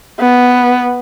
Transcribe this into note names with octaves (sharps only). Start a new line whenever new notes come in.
B3